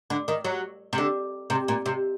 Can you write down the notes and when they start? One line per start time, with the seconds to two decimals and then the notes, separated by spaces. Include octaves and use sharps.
0.10 D3
0.28 D#3
0.45 F#3
0.93 C3
0.98 D3
1.50 C3
1.68 A#2
1.86 C3